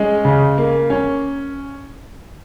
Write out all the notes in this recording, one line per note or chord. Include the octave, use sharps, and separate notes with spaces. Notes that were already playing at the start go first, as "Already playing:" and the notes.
Already playing: G#3 C#4
C#3
A#3
C#4